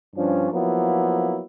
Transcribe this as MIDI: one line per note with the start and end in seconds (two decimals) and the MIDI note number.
0.16 0.50 43
0.16 0.50 53
0.16 0.50 61
0.16 0.50 62
0.51 1.42 53
0.51 1.42 54
0.51 1.42 58
0.51 1.42 59
0.51 1.42 64